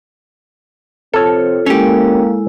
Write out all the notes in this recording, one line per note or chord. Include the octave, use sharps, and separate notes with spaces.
C3 F3 C4 F4 A4 C#5
G#3 A#3 C#4 E4 G4